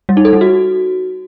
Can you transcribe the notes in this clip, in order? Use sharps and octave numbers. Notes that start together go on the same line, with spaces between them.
G3
D#4
A4
G3
F#4